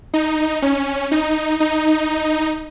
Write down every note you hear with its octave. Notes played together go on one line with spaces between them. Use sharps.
D#4
C#4
D#4
D#4